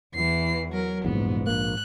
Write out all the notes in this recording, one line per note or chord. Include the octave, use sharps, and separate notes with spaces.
E2 E3 C7
F#3 A#4
F1 A#1 E2 G#2 B3
A#1 A#3 F#6